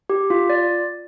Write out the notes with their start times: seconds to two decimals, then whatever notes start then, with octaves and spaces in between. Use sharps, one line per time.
0.10 G4
0.30 F4
0.50 D5